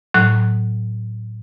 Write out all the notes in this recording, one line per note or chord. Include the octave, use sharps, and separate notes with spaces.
A2 F#3 F#6